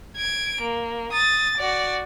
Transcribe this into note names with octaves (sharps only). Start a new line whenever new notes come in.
G#6 D7
A#3
D#6 A6
F#4 D5